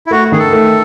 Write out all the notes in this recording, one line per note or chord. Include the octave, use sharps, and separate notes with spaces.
E4
A3 F#4
D#3 G#4
A4
A3